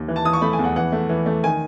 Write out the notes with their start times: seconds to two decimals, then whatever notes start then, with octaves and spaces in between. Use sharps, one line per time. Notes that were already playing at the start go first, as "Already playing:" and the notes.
Already playing: D#2
0.08 E3
0.16 A5
0.25 E3 D#6
0.33 C#6
0.42 A3 B5
0.53 G#5
0.59 E2
0.64 F#5
0.76 E3 F#5
0.92 A3
1.09 E3
1.26 A3
1.44 D#3 G#5